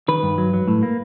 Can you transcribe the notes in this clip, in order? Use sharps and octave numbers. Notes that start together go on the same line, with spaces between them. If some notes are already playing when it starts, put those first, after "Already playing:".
D#3 B4
G2
F#3
F#3
A2
A#3